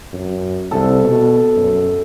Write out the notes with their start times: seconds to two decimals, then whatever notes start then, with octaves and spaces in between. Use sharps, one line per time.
0.13 F#2
0.71 C2 A4
1.04 B2
1.56 F#2